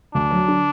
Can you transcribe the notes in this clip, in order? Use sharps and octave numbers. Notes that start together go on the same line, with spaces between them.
D2 D4
F#3
D3